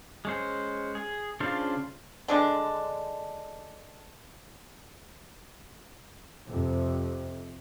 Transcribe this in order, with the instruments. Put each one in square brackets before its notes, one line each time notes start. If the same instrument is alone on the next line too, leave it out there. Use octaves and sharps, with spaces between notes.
[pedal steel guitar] G#3 C#4 C5
G#4
C#3 D4 F4 C5 F5
[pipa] D3 G#3 D4
[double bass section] F2 C3